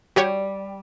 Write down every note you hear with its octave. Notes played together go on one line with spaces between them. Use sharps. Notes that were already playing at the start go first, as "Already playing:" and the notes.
G3 F#4 G4 C#5